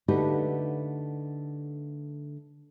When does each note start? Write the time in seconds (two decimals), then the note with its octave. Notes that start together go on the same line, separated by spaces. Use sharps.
0.08 D3 A3 D#4 F#4 G4 B4